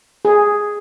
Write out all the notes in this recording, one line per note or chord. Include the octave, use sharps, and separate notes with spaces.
G#4